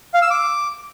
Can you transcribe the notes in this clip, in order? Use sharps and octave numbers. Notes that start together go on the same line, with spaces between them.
F5
E6
D6